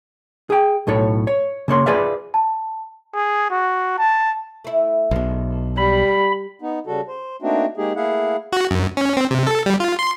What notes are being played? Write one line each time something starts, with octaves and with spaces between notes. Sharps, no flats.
G#4 G5
B1 A2 A4 C#5
C#5
C#3 A#3 C#5 C6
F4 G#4 B4 D5 E5 F5
A5
G#4
F#4
A5
A3 E4
B1 B2 G#3 D4
G3 B5
B3 D#4
C#3 G3 F#4 A4
C5
A3 A#3 C4 D4 D#4 F#4
G#3 A#3 D#4 G4 G#4
A3 A#3 E4 G#4 F5 F#5
F#4
F#2
C#4
C4
C3
A4
G3
F4
C6